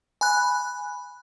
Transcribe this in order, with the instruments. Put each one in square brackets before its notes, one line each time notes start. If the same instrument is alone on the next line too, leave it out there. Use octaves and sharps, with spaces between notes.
[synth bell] G#5 B5 F#6